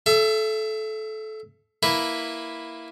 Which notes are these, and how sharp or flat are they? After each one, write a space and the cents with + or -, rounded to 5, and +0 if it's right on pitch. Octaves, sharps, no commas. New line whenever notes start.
A4 -20 E5 +30
A#3 +0 E4 +0 B4 +0